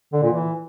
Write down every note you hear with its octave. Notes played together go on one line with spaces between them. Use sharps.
D3
A#2
E3